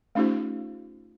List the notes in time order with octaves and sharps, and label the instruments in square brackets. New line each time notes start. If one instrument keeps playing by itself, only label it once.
[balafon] A3 C#4 D#4 F4 G4 C5